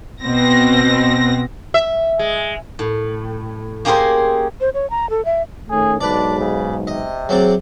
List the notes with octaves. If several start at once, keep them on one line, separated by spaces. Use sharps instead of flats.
B2 C4 A#6
E5
G#3
A2
A#3 C#4 G4 G#4 A#4 C5
C5
C#5
A#5
A4
E5
D#3 A3 C#4 G#4
B1 G#2 D4 B4 D5
C#3
C3 D#5
F#3 C4 G#4 D5